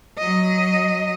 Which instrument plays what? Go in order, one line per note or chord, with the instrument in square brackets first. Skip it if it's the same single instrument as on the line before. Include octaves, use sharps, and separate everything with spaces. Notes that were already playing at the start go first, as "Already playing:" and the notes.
[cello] F#3 D#5